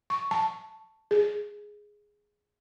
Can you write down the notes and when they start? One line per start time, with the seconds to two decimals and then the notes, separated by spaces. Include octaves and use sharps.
0.10 C#6
0.31 A5
1.11 G#4